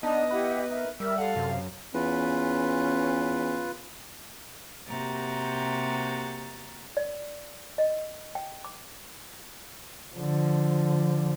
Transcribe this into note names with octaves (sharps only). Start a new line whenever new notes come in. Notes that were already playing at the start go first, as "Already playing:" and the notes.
B3 D4 D#4 D#5 A5
E4 G4 B4 F#5
D#4 A#4 E5
G3 A#4 D5 E5 E6
A4 F5 F#5
F#2 C3
E2 C#4 F4 B4
C3 A#3 F#4 G4 A#5 A6
D5
D#5
G5
D6
D3 F3